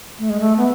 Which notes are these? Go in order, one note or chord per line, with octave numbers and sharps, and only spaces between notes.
A3
G#3
A3
B3